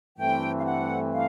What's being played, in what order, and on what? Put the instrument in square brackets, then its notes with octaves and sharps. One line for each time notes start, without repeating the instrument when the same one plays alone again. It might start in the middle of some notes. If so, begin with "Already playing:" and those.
[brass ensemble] G2 E3 A3 C4 [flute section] G5
[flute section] F5
F#5
F5